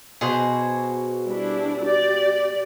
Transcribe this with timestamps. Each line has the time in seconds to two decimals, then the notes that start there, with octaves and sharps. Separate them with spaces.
0.21 B2 F#4 G#4 C5
1.26 G3 D4 E4
1.84 G4 D5